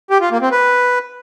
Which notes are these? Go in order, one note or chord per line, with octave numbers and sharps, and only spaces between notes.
G4
F4
A#3
C4
B4